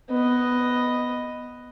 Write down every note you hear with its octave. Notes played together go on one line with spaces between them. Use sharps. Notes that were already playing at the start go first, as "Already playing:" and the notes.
B3 D#5